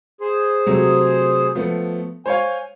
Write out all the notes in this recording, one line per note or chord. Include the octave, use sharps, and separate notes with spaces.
G#4 C5
C3 F#3 A3
F3 A3 B3
C5 C#5 F5 G#5